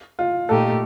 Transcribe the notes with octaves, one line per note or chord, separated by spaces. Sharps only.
F4
A#2 A3 D#4 G4 A4